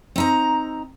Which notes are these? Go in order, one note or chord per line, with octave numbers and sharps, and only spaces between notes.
C4 D#4 A#5